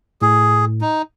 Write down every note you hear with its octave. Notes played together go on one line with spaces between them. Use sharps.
A2 G#4
D#4